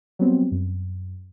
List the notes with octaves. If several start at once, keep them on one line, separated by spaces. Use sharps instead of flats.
F#3 G3 B3 C4
F#2